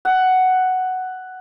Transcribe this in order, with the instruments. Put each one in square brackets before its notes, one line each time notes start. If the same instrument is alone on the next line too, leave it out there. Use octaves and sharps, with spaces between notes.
[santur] F#5